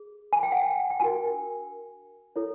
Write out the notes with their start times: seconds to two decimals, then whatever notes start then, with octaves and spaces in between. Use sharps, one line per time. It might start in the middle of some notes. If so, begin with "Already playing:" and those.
Already playing: G#4
0.33 G#5
0.43 G5
0.52 F#5
0.63 G5
0.90 G5
1.00 D4 F#4 A#4 G#5
2.36 E4 A4 C#5